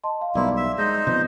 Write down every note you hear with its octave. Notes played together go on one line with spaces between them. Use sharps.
D#5 A5 C6
F5
B1 G3 A#3 B3 E4 D5 C6
E5
G#3 D#4 C5 D#5
C3 F3 B3